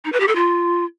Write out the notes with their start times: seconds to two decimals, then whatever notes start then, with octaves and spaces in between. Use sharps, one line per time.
0.05 D#4
0.12 B4
0.20 G4
0.28 A4
0.36 F4